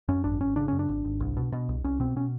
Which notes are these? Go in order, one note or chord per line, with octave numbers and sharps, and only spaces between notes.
F#2 C#4
G#1 D4
G#1 C#4
C#3 D4
F#2 C#4
D4
G#1
G#1
C2
B2
B2
C2
C2 C#4
B2 C4
B2 C#4